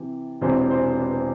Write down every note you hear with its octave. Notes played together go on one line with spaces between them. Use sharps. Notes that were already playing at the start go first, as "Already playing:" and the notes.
Already playing: C3 E3
E1 E2 C3 E3 C5
C5
B4
C5